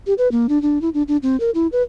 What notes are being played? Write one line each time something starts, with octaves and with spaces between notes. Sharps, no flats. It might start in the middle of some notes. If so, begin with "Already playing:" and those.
G4
B4
A#3
D4
D4
E4
D4
D4
C4
A#4
E4
B4